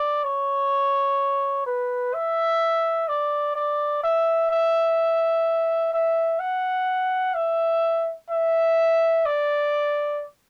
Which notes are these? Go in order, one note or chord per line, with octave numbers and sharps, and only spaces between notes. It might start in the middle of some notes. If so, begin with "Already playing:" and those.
Already playing: D5
C#5
B4
E5
D5
D5
E5
E5
E5
F#5
E5
E5
D5